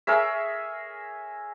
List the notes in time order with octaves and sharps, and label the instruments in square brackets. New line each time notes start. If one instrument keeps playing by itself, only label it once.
[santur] G#4 A#4 C#5 E5